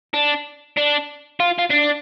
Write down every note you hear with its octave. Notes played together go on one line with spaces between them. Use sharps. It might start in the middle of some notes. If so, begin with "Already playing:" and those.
D4
D4
F4
F4
D4